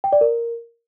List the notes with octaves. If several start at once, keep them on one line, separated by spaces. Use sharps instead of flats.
G5
D5
A#4